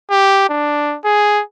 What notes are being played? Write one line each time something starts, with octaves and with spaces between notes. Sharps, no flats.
G4
D4
G#4